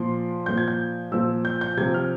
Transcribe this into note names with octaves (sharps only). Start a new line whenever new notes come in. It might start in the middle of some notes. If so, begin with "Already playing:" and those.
Already playing: A#2 F3 C6
A#2 F3 G6
G#6
G6
A#2 F3 E6
G6
G6
C3 F3 G#6
F6